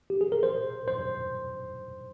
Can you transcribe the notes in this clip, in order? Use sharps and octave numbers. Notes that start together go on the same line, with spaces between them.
G4
G#4
A#4
C5
C5